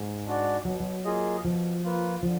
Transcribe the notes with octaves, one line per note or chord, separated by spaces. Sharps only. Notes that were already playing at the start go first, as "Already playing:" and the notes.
Already playing: G#2
G#3 D4 F#4 D5
B2 F#3
F#3
A#3 F4 G#4 D#5
B2 F3
A#3 F4 B4
D3 F3